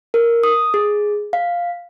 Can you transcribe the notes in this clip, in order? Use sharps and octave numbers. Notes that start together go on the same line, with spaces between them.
A#4
D#6
G#4
F5